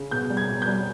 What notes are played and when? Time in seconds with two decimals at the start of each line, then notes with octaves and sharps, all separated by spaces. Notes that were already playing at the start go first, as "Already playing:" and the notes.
Already playing: C#3
0.11 B2 G6
0.30 G3
0.37 G#6
0.48 B2
0.62 G6
0.68 G3